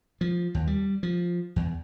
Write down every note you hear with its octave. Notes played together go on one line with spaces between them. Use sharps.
F3
D#2
G3
F3
E2